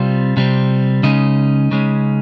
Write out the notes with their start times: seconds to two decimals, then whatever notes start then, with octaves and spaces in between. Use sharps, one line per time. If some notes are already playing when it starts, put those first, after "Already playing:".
Already playing: C3 G3 C4 F4
0.37 C3 G3 C4
1.03 C#3 G#3 C#4 D#4
1.71 C#3 G#3 C#4